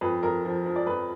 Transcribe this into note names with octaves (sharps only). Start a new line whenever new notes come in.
F2 B4
F2 A#4
F3
F3
D5
F2 B4